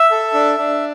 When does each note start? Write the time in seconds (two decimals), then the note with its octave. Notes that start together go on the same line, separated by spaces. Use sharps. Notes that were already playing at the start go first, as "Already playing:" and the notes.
Already playing: E5
0.12 A4
0.34 D4
0.58 D4